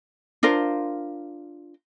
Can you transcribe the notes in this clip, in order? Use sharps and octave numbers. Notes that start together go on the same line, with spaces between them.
D4 F4 A#4 C5